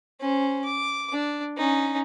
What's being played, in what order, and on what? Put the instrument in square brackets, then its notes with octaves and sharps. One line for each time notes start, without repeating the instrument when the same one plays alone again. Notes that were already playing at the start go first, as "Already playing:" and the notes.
[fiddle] C#4 C5
D6
D4
C#4 D#4